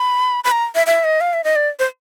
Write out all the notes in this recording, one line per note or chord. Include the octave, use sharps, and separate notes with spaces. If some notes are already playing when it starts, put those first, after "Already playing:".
Already playing: B5
B5
A#5
E5
E5
D#5
F5
E5
D#5
D5
C5